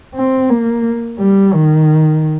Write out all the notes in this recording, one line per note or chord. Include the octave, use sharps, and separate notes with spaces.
C4
A#3
G3
D#3